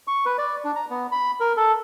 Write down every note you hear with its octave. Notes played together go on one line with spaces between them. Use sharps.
C#6
B4
D5
D4
A#5
B3
B5
A#4
A4